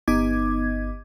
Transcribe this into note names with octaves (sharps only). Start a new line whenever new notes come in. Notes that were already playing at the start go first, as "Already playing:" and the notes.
G1 B3 D#4 D#5 D6 G#6